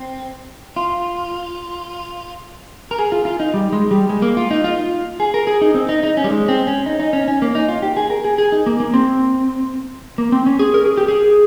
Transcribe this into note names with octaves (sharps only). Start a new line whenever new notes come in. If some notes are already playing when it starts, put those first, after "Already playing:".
Already playing: C4
F4
A#4
G#4
F4
F4
D#4
G3
G#3
G3
G#3
A#3
F4
D#4
F4
G#4
A#4
G#4
D#4
C4
D#4
D#4
C#4
G3
G#3
C4
C#4
D#4
D#4
C#4
C#4
A#3
D#4
F4
G4
G#4
A#4
G#4
G#4
D#4
A#3
A#3
C4
A#3
C4
C#4
G#4
A#4
G#4
G4
G#4